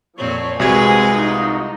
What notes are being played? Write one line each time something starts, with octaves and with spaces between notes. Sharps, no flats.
F2 A#2 F3 C4 C#5
C2 G#3 C4 F#4 G#4 B4 G#5 G#6
D#4 F4 D#5